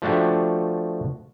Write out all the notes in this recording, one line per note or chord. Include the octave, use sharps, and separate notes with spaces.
F3 A3 D4 F#4 G4